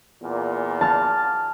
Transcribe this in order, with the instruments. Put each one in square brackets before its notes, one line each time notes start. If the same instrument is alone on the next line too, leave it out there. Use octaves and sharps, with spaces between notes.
[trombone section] E2 A#2
[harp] A5 F6